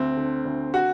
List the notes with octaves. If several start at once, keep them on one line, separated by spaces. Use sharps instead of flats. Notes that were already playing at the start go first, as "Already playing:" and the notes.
Already playing: D2 C4
D3
D2
F#4